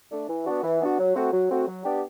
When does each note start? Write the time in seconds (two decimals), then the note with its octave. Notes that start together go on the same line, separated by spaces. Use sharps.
0.11 A3 D4
0.29 E3
0.46 B3 D4 F#4
0.63 E3
0.80 B3 D4 F#4
0.98 F#3
1.15 A3 C4 F#4
1.32 F#3
1.50 A3 C4 F#4
1.66 F#3
1.84 B3 D4 G4